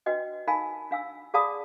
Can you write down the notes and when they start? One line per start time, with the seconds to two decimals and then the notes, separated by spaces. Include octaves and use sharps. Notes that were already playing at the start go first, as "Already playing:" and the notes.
0.06 D4 F#4 B4 D#5 G5
0.47 D#4 A#4 F5 G#5 A5 B5
0.91 D4 F5 G#5 E6
1.34 G#4 D5 F5 A5 B5 D#6